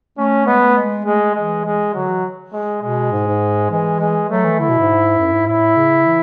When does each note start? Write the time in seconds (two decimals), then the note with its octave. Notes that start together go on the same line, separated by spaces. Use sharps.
0.18 A3 C#4
0.47 G#3 B3
0.62 A3
0.77 G#3
1.06 G#3 A3
1.35 E3 G#3
1.65 G#3
1.94 D3 F#3
2.09 E3
2.53 G#3
2.82 B2 G#3
3.12 G#2
3.27 G#2
3.71 E3 G#3
4.00 G#3
4.30 F#3 A3
4.44 E3
4.59 D3 E4
4.69 B2
4.79 G#2
5.19 F#2
5.33 G#2
5.47 A2 E4
5.77 C#3
6.06 E3